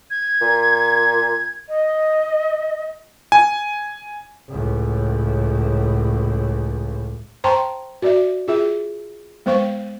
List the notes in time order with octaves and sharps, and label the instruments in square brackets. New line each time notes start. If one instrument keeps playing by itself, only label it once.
[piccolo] G#6
[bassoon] A#2
[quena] D#5
[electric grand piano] G#5
[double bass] C#2 A2
[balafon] C5 G5 A5 A#5 C6 C#6
F#4 D5 E5
F4 G#4 E5
G#3 B3 C5 F5 C#6